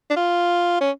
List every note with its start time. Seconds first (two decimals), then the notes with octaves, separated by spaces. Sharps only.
0.10 D4
0.16 F4
0.81 C#4